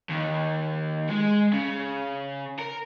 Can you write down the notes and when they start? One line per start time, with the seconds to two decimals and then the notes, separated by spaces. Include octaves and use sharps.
0.09 D#2
1.10 G#3
1.53 C#3
2.59 A#4